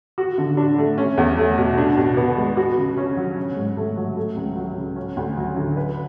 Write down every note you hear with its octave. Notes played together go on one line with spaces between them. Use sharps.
F#4
D3
D4
A3
C#4
E2
A3
B2
D4
B2
B3
G#3
F#4
C#3
C#4
F#3
C#4
G#2
A3
F#3
A3
C#2
F#3
C#3
C#4
D2
F#3
D3
B4